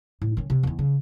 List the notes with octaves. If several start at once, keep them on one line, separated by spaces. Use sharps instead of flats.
A2
D#3 C#4
C3
E2 D#3
C#3